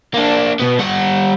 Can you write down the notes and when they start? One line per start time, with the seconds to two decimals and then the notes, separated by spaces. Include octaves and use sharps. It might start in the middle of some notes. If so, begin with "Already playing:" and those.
0.14 A#3 D4
0.60 B2 B3
0.79 G3 F#5